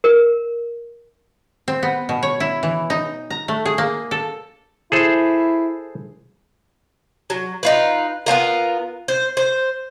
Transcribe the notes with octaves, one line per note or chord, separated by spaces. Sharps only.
A#4
C4
B3
B2
C#5
E4
E3
D#4
A#5
A3
G#4
A#3
A4
E4 G#4 A4 C5
F#3
D#4 F4 B4
B3 C4 F4 A#4
C5
C5